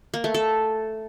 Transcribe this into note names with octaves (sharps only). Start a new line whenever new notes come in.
A#3
A3
A4